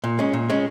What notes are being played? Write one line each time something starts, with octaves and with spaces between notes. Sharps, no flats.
A#2
G#3 C#4
A#2
G#3 C#4